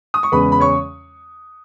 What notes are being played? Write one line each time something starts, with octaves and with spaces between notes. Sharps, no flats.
D#6
C#6
E2 C#3 G#3 C#4 B4 B5
B5
C#5 C#6